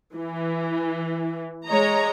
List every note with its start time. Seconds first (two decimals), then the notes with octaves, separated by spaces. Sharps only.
0.15 E3
1.66 G#3 C#5 D#5 A#5